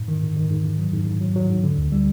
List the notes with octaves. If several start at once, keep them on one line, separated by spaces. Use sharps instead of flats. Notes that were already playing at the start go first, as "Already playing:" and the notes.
Already playing: G#2
D#3
G#2
D#3
G#2
G#2
F#3
G#2
G#2
F#3
F#3
G#2
D3
D2
G3